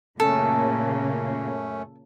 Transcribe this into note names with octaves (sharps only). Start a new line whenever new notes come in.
F#2 A#2 C#3 A3 A#3 C#4 A4